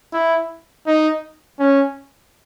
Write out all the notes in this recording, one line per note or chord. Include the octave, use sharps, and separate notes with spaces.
E4
D#4
C#4